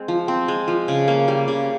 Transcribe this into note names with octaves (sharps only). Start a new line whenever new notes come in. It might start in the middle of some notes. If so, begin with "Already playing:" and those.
Already playing: G#3 C4
F3
C4
G#3
F3
C#3
A#3
G3
C#3